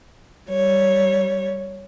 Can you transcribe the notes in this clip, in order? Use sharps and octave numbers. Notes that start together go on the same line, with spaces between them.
G3 C#5